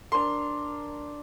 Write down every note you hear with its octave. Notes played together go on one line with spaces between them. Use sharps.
D4 A#4 C6